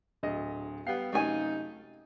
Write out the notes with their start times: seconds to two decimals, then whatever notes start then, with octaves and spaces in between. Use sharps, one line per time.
0.23 D1 D2 D#5
0.86 G3 B3 F5 G5 C7
1.13 F#2 C3 A3 D#4 G#5